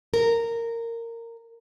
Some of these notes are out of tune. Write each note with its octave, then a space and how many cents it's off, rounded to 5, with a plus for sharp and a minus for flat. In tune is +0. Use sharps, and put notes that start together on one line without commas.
A#4 -15